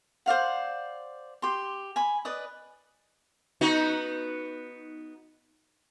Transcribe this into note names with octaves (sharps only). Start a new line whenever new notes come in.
C5 D5 F5 F#5
G4 C6
G#5 B5
B4 D5 D#5 D#6
B3 D#4 F#4